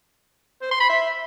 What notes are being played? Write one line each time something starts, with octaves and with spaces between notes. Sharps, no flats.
C5
C6
B5
E5